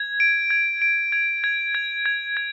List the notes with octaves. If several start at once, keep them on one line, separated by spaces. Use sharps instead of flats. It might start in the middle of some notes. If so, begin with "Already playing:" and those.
Already playing: G#6
D7
G#6
D7
G#6
G#6
G#6
G#6
G#6